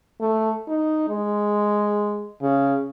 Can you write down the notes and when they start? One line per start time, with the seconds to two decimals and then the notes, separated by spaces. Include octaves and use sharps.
0.21 A3
0.68 D#4
1.09 G#3
2.42 C#3